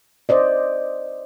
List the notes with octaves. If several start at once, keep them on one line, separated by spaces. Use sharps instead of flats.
C5 D5 D#5